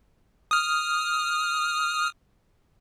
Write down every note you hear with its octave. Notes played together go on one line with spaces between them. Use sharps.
D#6 F6